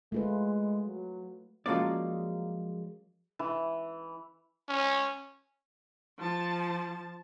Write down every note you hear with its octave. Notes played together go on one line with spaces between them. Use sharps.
G#3 A3 F4 B4
F#3
F3 F#3 G#3 A#3 C#4 D5
E3
C#4
F3 A5